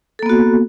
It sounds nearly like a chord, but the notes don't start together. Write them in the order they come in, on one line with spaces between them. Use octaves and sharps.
A4 A#3 B3 F#4